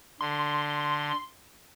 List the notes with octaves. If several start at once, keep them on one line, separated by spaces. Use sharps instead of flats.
D3 C6